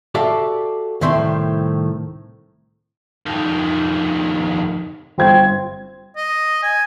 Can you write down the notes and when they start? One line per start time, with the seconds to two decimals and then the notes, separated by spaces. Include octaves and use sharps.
0.15 F#4 G4 A4 D5 E5 F5
1.01 C2 A2 D#3 C4 E5 C6
3.26 F2 D#3
5.18 G1 C4 G#6
6.17 D#5
6.63 G#5